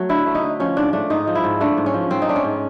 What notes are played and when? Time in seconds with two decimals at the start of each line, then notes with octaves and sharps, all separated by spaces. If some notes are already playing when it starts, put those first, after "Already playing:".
Already playing: F#3 A3
0.09 D3 E4
0.26 A3
0.35 D#4
0.43 D3
0.60 F3 C#4
0.77 G#2 D4
0.93 A3 D4
1.10 G#2 D#4
1.27 F3
1.35 E4
1.44 G#2
1.61 A3 D4
1.77 G#2
1.86 C#4
1.94 F3
2.10 G#2 C4
2.22 D#4
2.28 A3 D4
2.36 C#4
2.44 G#2